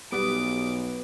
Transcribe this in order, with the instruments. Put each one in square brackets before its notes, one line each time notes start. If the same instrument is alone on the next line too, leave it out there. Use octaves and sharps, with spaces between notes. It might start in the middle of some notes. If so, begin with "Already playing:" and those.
[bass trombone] B1 [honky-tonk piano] G3 [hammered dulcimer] B3 [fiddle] D6